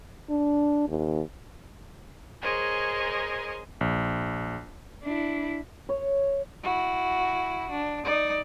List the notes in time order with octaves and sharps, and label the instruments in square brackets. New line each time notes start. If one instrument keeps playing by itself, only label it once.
[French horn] D4
D#2
[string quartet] G#4 A#4 C5 C#5 D#5 G#5
[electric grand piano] A#1
[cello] D4 E4
[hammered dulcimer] C#5
[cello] E4 F#4
D4
D#4 D5